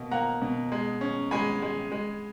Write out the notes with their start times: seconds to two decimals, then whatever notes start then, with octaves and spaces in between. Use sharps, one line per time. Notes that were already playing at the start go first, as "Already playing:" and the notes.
Already playing: B2 A#3
0.11 A#3 F#5 A#5
0.42 B2
0.72 G#3
1.01 C#4
1.31 G#3 G#5 B5
1.62 G#3
1.92 G#3